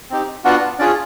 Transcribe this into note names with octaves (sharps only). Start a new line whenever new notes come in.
C4 D#4 G4
B3 D4 F4 F#4 F#5
C#4 D4 F4 G#4 D5